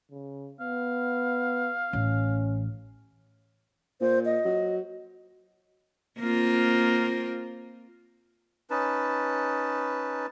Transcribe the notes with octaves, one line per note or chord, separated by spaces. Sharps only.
C#3
B3 F5
A1 C#4
A#2 C5
D#5
F#3
A#3 C4 F4
C#4 D#4 B4 A5